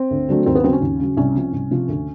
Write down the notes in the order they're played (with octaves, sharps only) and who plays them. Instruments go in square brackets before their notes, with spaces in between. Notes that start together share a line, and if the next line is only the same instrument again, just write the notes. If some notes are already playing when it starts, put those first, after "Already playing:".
Already playing: [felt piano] C4
D2
D3 F#3 A3
D#2 C4
B3
C#3 F#3 C4
C#4
D#2
C#3 F#3
C2 C#4
C3 F3
C2
C3 F3
D2